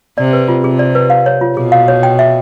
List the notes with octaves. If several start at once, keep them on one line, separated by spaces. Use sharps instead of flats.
C3 D5
B4
F4
C3 G#4
D5
B4
F5
C#5
F4
B2 G#4
F5
C#5
G5
E5